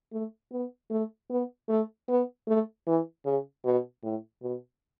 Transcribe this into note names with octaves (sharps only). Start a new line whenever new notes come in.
A3
B3
A3
B3
A3
B3
A3
E3
C#3
B2
A2
B2